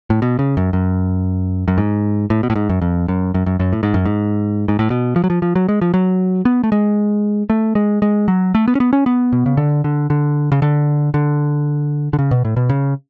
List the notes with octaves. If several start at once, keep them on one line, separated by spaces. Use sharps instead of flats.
A2
B2
C#3
F#2
F#2
F#2
G#2
A2
B2
A2
G#2
F#2
F2
F#2
F#2
F#2
F#2
A2
G#2
F#2
G#2
G#2
A2
B2
F3
F#3
F3
F3
F#3
G#3
F3
F#3
B3
A3
G#3
A3
G#3
G#3
F#3
A3
B3
C#4
B3
C#4
B3
B2
C#3
D3
D3
D3
C#3
D3
D3
D3
C#3
B2
A2
B2
C#3